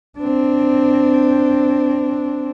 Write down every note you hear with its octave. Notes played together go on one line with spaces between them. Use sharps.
C4 D4